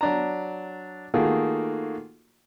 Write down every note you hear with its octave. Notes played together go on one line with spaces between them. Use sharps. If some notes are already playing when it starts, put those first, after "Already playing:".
F#3 D4 A#5
D#3 A3 A#3 F4 F#4 G#4